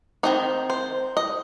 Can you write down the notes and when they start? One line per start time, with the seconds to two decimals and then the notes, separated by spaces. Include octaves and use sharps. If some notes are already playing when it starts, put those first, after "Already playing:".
0.23 D#3 C4 D#4 D#5
0.70 C5
1.17 D#5